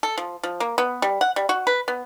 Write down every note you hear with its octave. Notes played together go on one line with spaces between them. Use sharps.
A4
F3
F3
A#3
B3
G3
F#5
G3
F#4
B4
B3